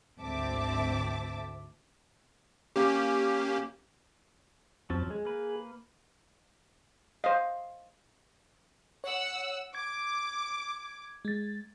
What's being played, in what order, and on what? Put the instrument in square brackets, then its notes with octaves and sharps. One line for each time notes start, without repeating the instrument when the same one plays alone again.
[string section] G#1 D2 C4 E5 A5 D6
[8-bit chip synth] A#3 C#4 G4
[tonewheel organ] F2 C4 A5 [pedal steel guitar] F3 F#3 C#4
[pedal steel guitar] G#3 [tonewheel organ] G#4
[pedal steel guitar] A#3 B4
[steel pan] C5 D#5 [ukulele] F5
[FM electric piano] C#5 [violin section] F#5 E6
[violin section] D6 [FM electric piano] G#6
[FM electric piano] G#3 A6